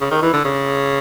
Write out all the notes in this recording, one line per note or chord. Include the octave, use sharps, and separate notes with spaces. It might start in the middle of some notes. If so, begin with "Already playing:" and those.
C#3
D#3
E3
D3
C#3